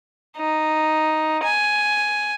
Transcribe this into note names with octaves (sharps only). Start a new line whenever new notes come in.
D#4
G#5